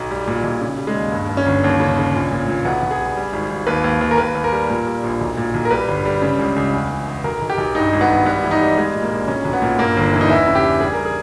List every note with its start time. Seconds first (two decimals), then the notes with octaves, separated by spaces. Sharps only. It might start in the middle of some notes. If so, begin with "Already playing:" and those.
Already playing: B1
0.11 G3
0.27 A#2
0.44 B1
0.61 C#3
0.78 G3
0.87 G#3
0.95 D#2
1.12 G2
1.29 G2
1.37 C#4
1.46 G1
1.64 D#2
1.80 C#3
1.97 C#3
2.14 A#1
2.31 A#2
2.48 A#2
2.65 B1 B3
2.83 B1
2.91 G#4
2.99 G3
3.17 G3
3.33 G#1
3.51 G#1
3.67 D#2 B4
3.84 D#2
4.01 D#2
4.11 A#4
4.18 D#2 B4
4.35 D#2
4.44 A#4
4.52 G3
4.70 A#2
4.87 G3
5.03 A#1
5.21 B1
5.37 A#2
5.54 B1
5.65 A#4
5.71 G3 B4
5.88 G1
6.05 G3
6.22 C#3
6.39 C#2
6.56 C#2
6.74 E2
6.90 E2
7.08 E2
7.24 B1 A#4
7.42 B1
7.50 G4
7.58 B1
7.75 G2 D#4
7.93 G#1
8.01 B3
8.09 G#1
8.26 G3 B3
8.44 E3
8.51 D#4
8.61 G3
8.77 G3 G#3
8.94 A#2
9.02 A#3
9.11 A#1
9.28 B1 C#4
9.45 B1
9.53 B3
9.62 A#2
9.79 G2 A#3
9.97 G1
10.13 E3
10.21 D#4
10.30 E2 E4
10.47 C#3
10.55 G4
10.65 E2
10.81 G3 G#4
10.93 G3 A#4
11.05 G#4